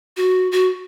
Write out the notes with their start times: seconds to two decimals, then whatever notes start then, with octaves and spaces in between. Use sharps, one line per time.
0.17 F#4
0.52 F#4